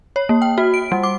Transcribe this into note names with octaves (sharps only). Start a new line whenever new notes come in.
C#5
A#3
G5
F#4
D7
G3
D6